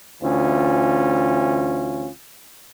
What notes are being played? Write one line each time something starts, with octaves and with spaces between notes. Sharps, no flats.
D2 E3 C#4 F4